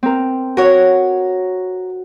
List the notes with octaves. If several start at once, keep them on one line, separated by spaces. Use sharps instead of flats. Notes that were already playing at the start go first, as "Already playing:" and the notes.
C4 A#4
F#4 A#4 C#5